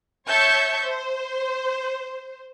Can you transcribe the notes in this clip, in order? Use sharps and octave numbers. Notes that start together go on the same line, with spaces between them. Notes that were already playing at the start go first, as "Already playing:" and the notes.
C#5 E5 A5 C#6 G6
C5